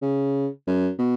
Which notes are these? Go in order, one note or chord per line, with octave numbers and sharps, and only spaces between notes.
C#3
F#2
B2